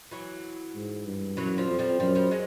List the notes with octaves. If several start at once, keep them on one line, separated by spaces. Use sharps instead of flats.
E3 F#3
G#2
G2
F#2 E3 F#3
F3 G3
F2
F3 G3
F#2 F3 G3
F3 G3
F#3 G#3